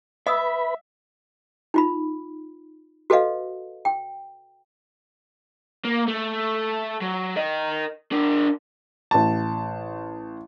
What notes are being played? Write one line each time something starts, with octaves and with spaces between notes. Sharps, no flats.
B4 D#5 E5 B5 D#6 E6
D#4 F4 B5
F#4 A4 B4 D#5 F5
G5
A#3
A3
F#3
A#4 D#5
D4 A#4
A1 A5